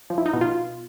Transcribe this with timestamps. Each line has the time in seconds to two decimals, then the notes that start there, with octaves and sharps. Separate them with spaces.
0.10 F3
0.18 E4
0.26 D#4
0.33 B2
0.41 F4